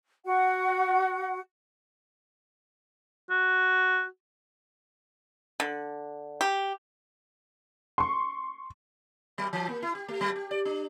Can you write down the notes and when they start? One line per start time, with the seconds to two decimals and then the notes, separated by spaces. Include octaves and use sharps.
0.25 F#4 F#5
3.30 F#4
5.60 D3
6.41 G4
7.98 C6 C#6
9.38 F#3
9.53 E3
9.69 A#3
9.82 E4
9.95 G4
10.08 A3
10.21 F#3
10.36 G4
10.51 D5
10.65 D4